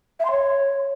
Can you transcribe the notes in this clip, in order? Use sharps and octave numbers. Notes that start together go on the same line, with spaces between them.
E5
C6
C#5